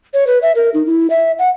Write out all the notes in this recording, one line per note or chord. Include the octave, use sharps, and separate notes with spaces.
C#5
B4
E5
A#4
D#4
E4
E5
F#5